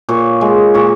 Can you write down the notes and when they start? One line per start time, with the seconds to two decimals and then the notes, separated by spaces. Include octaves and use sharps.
0.09 A#2 C#5
0.41 G#3
0.74 A#2 C#5